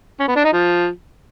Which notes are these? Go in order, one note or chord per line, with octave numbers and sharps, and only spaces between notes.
C#4
B3
D4
D#4
F3